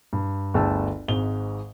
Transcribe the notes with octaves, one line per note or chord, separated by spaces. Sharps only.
G2
G1 D2 G#4 G5 A5 E6
G#1 G#2 G7